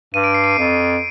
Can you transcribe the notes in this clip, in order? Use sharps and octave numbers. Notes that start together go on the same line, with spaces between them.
G2 D#7
D7
C7
D7
F2